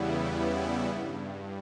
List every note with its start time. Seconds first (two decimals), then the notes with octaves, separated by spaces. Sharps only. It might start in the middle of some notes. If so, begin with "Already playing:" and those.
Already playing: E2 C#3 G3 B3 E4
0.85 G2